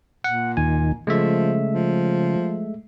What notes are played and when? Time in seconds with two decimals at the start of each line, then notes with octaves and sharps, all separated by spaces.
0.24 A#2 F#5
0.57 D#2 D#3 G#5
1.07 C#3 F3 G#3 A3 E5
1.72 F3